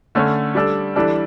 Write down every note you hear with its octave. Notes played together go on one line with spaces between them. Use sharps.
D3 A3 C#4
G3 D4 A4
E3 G3 D4 A4